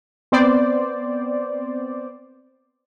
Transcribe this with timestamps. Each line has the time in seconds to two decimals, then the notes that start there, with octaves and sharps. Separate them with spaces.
0.32 B3 C4 C5 D5